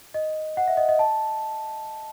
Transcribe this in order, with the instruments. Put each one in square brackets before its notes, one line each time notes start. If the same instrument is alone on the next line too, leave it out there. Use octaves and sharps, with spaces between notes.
[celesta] D#5
F#5
E5
D#5
D#5
A5